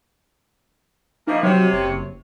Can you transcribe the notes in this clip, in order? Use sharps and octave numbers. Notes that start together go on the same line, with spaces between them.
E3 F3 A#3 D#4
C3 F#3 C#5
F#1